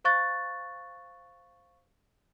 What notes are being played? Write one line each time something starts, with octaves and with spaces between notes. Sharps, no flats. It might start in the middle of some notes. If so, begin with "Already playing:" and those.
C5 F5 C#6 F#6 A6